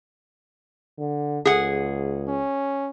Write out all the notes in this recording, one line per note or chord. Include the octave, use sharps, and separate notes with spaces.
D3
C#2 G#4 F#5
C#4